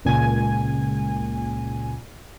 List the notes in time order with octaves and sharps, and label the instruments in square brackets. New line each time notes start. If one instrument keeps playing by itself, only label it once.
[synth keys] C#2 A#2 G#5